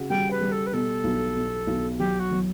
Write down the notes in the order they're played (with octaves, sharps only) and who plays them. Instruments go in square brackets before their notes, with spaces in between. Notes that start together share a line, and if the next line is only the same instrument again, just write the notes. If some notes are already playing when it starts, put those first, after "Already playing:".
Already playing: [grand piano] C#3 F#4
[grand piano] G3 [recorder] G5
[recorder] B4
[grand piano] G3
[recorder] A4
B4
[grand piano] B2 [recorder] A4
[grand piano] B1
B2
B1
[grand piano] F#3 [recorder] G4
[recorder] F#4
[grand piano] F#3